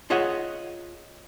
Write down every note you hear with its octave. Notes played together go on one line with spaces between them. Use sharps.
F4 G#4 C#5 D#5 E5 F#5